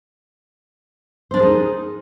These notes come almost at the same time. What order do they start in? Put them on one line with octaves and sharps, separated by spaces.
C5 D4 A#4 G#4 D#4